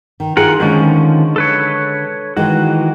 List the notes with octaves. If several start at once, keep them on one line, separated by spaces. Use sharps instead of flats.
D#3
D#3 E4 F4 G#4 A#4 F#5
D3 D#3 F3 G#3 C#4
A4 B4 C#5
D#3 E3 G#3 F#4